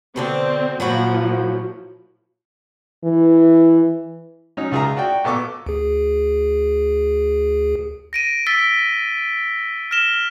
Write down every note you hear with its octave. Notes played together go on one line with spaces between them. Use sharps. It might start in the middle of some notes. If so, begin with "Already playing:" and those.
B2 D3 C4 D4
A#2 F3 F#3 E4 F#4
E3
F#3 C#4 D#4
C#2 F4 G#4 E5 A#5
F#4 D5 G5
A#1 B3 A4 C#6 D6
D2 G#4
A#6 D7 D#7
E6 A6 B6 D7 G7
F6 A#6 E7 G7